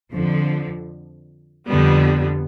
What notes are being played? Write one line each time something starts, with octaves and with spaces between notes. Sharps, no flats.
F2 D3 F3
F2 D3 G3 B3